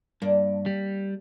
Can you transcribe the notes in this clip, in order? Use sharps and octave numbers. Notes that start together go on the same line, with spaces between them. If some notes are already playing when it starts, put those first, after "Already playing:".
G2 A#3 D4
G3